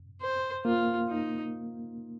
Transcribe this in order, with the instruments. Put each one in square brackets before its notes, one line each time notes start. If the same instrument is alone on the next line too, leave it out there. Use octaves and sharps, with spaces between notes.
[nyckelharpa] C5
[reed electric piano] A#3 [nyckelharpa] F4
[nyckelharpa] D#4